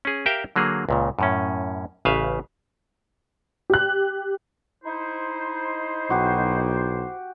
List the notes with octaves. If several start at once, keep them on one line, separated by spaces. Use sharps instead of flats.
C#4 G#4
G4 A#4 E5 F5 G5
D3 F#3 A#3 G#4
C#2 A#2 C#3
F#2 A2 C#4
A1 C#3 B4 E5 F5
G4 F#6
D#4 E4 C5
B1 F#4 G4